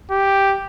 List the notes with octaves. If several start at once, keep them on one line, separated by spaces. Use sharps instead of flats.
G4